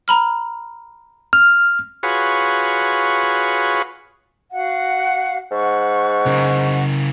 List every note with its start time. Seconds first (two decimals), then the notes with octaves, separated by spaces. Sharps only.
0.08 A#5 B5 F6
1.33 F6
2.03 F4 F#4 G#4 B4 C#5
4.52 F#4 F5 F#5
5.51 G#2 F#5 C#6
6.26 C#3 A#4